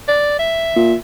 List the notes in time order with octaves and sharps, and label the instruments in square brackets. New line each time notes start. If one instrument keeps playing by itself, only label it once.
[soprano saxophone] D5
E5
[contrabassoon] A#2